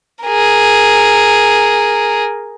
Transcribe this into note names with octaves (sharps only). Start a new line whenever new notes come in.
G#4 A#4